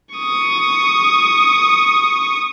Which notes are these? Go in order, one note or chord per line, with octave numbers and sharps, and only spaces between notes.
C#6 D#6